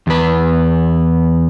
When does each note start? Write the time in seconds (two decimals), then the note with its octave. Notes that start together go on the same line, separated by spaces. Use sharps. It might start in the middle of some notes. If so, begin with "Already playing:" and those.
0.07 E2 B4